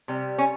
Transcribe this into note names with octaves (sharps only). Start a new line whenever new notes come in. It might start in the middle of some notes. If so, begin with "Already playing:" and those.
C3 G3
C#4